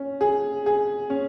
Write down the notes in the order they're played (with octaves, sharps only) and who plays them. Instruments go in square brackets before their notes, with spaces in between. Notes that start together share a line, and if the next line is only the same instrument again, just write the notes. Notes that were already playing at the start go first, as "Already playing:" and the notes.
Already playing: [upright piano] C#4
G#4
G#4
C#4